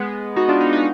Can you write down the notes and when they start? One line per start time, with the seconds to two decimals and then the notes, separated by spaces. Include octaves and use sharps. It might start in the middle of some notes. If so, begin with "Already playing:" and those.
Already playing: G#3 B3
0.36 D#4 F#4
0.49 D4 F4
0.60 B3 D#4
0.72 B3 D#4